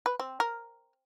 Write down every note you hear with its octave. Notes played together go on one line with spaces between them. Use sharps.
B4
C4
A#4